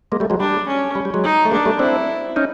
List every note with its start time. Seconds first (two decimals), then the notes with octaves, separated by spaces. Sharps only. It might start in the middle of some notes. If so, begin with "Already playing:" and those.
0.12 G#3 A#3
0.20 G3 A3
0.30 F#3 G#3
0.39 G3 D4
0.68 C#4
0.95 G3
1.05 G3
1.14 F#3 G#3
1.24 D#4
1.45 A3
1.52 G#3 A#3 D4
1.65 G3 A3
1.79 C4 D4 E4
2.36 C#4 D#4